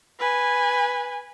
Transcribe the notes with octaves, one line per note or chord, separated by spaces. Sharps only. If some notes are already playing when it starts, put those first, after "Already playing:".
B4 G#5